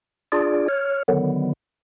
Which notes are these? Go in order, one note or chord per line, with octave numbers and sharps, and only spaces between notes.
D4 F4 G#4 D5
C#5 F6
D3 D#3 F#3 B3